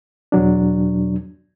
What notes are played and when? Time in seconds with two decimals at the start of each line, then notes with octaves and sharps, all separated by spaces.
0.32 E2 B2 F#3 D4